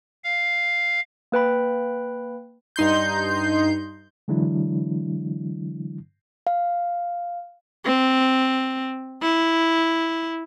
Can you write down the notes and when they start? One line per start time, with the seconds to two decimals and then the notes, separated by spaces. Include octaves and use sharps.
0.24 F5
1.32 A#3 B4 G5 B5
2.76 G2 D#4 C6 G6
4.28 D3 E3 F#3 G#3 D4 E4
6.47 F5
7.86 C4
9.23 E4